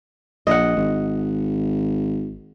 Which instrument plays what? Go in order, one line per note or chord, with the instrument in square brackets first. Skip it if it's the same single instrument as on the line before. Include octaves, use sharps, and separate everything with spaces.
[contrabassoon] A#1 [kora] D#5 F#5
[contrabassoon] G#1